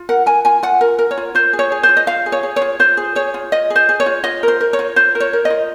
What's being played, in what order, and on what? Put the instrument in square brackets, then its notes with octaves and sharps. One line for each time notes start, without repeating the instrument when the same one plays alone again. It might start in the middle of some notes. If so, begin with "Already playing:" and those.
Already playing: [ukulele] F4
A#4 F#5
A#4 G#5
F4 G#5
F4 F#5
A#4
A#4
C#5
F4
F4 C5
G#4
C#5
G#4
C5
F4
D#5
F4 F5
G#4
C#5
G#4
C#5
F4
F4 C5
G#4
G#4 C#5
F4
F4 D#5
G#4
C5
G#4
C#5
F4
F4 D#5
A#4 C5
A#4
C#5
F4
F4 C5
A#4
C#5
A#4
D#5
F4